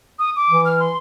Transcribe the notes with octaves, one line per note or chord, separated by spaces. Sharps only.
D#6
D6
E3
F6
C6